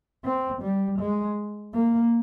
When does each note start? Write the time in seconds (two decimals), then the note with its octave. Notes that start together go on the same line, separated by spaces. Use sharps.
0.24 C4
0.62 G3
0.99 G#3
1.74 A#3